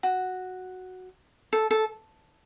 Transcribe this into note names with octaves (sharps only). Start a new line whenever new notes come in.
F#4
A4
A4